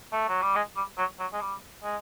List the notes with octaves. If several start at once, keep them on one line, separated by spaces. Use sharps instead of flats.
A3
F#3
G3
G#3
G3
F#3
F#3
G#3
G3
G#3